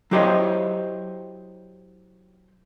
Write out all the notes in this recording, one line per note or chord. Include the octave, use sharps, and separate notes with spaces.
F#3 E4 G4 C5 C#5 D#5